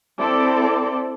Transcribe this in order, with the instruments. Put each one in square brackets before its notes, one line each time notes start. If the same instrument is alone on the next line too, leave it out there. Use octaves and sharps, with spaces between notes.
[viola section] C4 E4 A4 D5